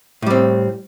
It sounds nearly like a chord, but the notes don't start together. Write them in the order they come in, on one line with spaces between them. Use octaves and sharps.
A2 G3 C4